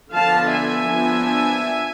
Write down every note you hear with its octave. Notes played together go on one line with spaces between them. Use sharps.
D3 F3 B3 D4 F5 A5
E5 G#5
F3 B3 D4